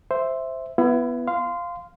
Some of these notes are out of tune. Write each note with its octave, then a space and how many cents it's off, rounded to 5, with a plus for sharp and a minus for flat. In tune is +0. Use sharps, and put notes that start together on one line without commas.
C5 +0 E5 +0
B3 +0 E4 +30
F5 +0 C6 -20